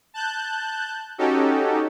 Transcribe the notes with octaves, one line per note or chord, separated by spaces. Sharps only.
A5 F#6 G6
C#4 D#4 F#4 G4 A4